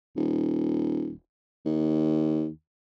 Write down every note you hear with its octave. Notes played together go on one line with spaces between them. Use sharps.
D#1
D#2